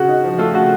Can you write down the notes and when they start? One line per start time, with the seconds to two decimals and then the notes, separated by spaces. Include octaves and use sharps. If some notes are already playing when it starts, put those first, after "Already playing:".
Already playing: C#3 F#4
0.08 D#4
0.24 F3
0.38 A3 F4 A4
0.54 C#3 F#4